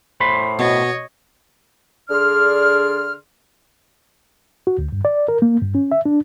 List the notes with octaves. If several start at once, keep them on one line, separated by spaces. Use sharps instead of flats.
A2 C5 B5
B2 C#5 D#5
D3 D4 G#4 D5 C6 F6
F#4
D2
G2
D5
A#4
A#3
G2
C#4
E5
D4